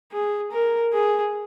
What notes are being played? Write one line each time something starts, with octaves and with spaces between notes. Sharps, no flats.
G#4
A#4
G#4